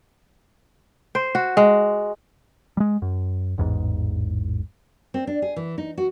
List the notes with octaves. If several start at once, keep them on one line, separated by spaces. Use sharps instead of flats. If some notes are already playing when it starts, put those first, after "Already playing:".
C5
F#4
G#3
G3 G#3
F#2
A1 E2 G#2
C4
D4
G#4
E3
D#4
F#4